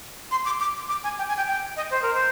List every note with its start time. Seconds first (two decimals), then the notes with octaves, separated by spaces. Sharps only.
0.31 C6
0.45 D6
0.60 D6
0.89 D6
1.04 G#5
1.18 G5
1.28 G#5
1.37 G5
1.47 G5
1.77 D#5
1.91 C5
2.02 A#4
2.14 C5